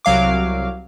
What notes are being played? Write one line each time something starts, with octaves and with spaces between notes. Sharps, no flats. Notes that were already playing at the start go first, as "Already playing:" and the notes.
C2 F#3 F5 D6